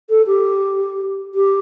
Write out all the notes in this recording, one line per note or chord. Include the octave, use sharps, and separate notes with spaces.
A4
G4
G4